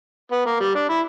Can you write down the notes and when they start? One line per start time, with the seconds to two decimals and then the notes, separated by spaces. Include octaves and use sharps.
0.32 B3
0.46 A#3
0.61 G3
0.75 D4
0.89 E4